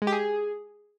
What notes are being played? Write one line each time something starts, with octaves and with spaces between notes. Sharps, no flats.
G#3
G4
G#4